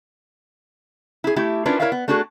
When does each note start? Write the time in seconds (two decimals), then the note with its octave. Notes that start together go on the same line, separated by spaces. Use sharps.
1.24 E4 G#4
1.36 A3 E4 G4
1.65 C#4 D4 E4 F4 A#4 B4
1.80 E4 A#4 C#5 D5 E5 F5
1.92 B3
2.08 A3 D4 F#4 G#4 A4